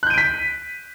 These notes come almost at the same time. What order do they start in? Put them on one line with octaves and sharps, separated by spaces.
F#6 G6 D#7 D7 B6